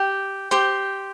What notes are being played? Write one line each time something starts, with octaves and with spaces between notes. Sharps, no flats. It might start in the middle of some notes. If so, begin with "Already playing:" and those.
Already playing: G4
G4 C5